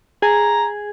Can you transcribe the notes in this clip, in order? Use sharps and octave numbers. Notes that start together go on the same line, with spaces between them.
G#4 A#5